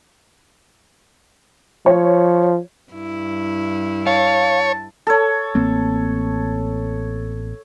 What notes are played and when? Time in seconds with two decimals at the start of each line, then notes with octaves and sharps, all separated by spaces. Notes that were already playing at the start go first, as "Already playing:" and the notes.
1.86 F3 C#5
2.92 G2 E4
4.07 C#5 F5 A5
5.07 A4 C#5
5.55 A1 A#3 C4